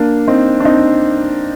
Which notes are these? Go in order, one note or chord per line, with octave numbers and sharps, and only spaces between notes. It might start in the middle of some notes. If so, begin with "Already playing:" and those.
Already playing: A#3 D4
C4 D#4
D4
C4 D#4